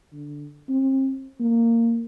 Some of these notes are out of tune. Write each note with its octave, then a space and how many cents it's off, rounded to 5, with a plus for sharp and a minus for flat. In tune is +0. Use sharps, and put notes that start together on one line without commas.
D3 -5
C4 +35
A#3 -15